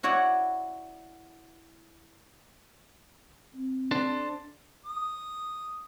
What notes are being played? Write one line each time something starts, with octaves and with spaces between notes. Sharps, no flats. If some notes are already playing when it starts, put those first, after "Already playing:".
E4 F#4 C#5 D5 F#5
C4
D4 A4 C5
D#6